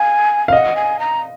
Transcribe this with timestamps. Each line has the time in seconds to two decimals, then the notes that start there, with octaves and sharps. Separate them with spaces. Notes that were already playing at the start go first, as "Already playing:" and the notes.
Already playing: F5 G#5
0.48 F5
0.52 D#5 F#5
0.76 G#5
0.99 A#5